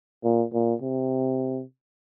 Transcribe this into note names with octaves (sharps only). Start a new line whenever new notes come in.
A#2
A#2
C3